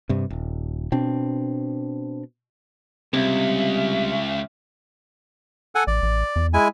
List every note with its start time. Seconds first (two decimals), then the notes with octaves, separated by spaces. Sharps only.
0.09 G2 C3
0.30 D#1
0.92 B2 C4 D4
3.13 C#2 C3 G3 E5
5.75 A4 F#5 G#5
5.87 A1 D5
6.03 A1
6.36 E2
6.53 G#3 E4 G#5